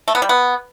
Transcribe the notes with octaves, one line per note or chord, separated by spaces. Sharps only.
A3
B3
G3
B3